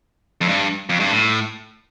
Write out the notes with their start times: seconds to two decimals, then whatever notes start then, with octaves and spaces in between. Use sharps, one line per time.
0.41 F2
0.48 G2
0.89 F2
1.00 G2
1.11 A2